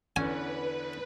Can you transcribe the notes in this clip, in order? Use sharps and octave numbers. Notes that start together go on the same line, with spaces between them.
E2 D3 E3 C#4 B4 G#5